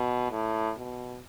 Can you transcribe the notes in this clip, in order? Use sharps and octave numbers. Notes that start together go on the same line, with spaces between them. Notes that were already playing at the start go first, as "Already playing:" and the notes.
Already playing: B2
A2
B2